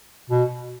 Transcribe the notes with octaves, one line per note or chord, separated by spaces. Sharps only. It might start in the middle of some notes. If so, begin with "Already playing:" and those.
B2